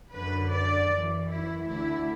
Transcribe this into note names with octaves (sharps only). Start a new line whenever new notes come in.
F#2 D3 B4
D5
F#2 E3
E4
D2 D3 E4